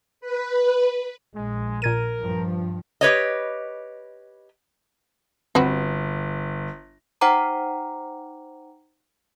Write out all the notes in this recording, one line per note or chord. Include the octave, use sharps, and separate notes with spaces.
B4
A#1 G#3
A#2 A#4 G#6 D#7
G2 F3
G4 B4 C#5 D#5
G1 C4 F#4 B4
D#4 C5 F#5 G5 A#5 D6